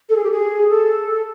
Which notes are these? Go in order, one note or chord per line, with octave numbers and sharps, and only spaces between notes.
A4
G#4
G4
G#4
A4